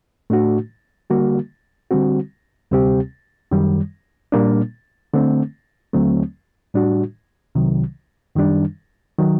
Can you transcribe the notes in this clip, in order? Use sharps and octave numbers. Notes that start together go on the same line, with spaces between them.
A2 A3 D4 F#4
D3 G3 A#3 F#4
D3 G3 C4 F#4
D2 C3 G3 C4 G4
F#2 D#3 G3
A#2 G3 A#3 D4
D3 A3 C4
D#2 D3 F#3 A3 C4
A2 G3 D4 F#4
C2 C3 D#3 F#3
F#2 D#3 G3 D4
D#3 F#3